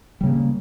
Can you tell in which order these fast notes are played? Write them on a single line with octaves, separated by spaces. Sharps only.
G3 C#3 A#3